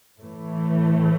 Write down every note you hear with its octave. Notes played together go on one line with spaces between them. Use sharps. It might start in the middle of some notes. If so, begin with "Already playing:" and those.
A2 E3 A3